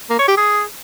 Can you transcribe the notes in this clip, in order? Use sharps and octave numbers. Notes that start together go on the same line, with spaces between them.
A#3
C#5
G4
G#4